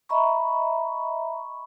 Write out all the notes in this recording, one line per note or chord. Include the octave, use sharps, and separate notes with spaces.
D#5 E5 A#5 B5 C#6